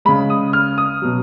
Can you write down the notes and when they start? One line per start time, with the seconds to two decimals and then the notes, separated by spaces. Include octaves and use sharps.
0.05 C#3 G#3 B5
0.30 D#6
0.53 F6
0.78 D#6
1.02 B2 F#3